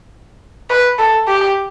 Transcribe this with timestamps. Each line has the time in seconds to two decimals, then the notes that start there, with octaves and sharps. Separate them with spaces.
0.70 B4
0.99 A4
1.28 G4